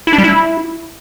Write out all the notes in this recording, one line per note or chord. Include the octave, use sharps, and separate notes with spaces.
E4
D4
G3
E4